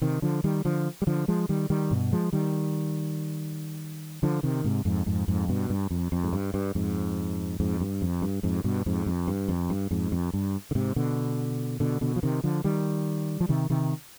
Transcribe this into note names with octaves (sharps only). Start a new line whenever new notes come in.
C3 D#3
D3 F3
D#3 G3
D3 F3
G3
D3 F3
F3 G#3
D#3 G3
D#3 G3
G2 B2
F3 G#3
D#3 G3
D3 F3
C3 D#3
G#2 C3
F2 G#2
F2 G#2
F2 G#2
G2 B2
G2
F2
F2
G#2
G2
G2
F2 G#2
F2 G#2
G2
F2
G2
F2 G#2
G2 B2
F2 G#2
F2
G2
F2
G2
F2 G#2
F2
G2
D3
G#2 C3
B2 D3
B2 D3
B2 D3
F3
C3 D#3
D3 F3
D#3 G3
F3
C3 D#3
C3 D#3